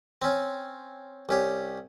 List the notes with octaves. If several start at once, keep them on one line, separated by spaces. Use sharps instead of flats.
C4 C#4
C2 C#4 G4